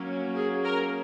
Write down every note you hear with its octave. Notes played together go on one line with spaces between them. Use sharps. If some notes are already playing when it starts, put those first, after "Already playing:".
Already playing: F#3 A#3 C#4
G#4
A#4